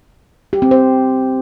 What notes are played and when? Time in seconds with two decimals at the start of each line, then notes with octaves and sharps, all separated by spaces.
0.53 G4
0.62 C4
0.71 C5